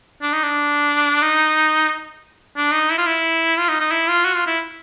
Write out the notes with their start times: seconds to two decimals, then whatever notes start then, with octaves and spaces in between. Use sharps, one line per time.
0.22 D4
0.33 D#4
0.44 D4
1.22 D#4
2.57 D4
2.73 D#4
2.91 E4
2.98 F4
3.06 E4
3.57 F4
3.69 D#4
3.80 D#4
3.91 E4
4.08 F4
4.25 F#4
4.36 F4
4.47 E4